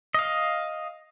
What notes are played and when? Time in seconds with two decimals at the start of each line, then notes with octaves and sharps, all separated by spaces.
0.14 D#5 F5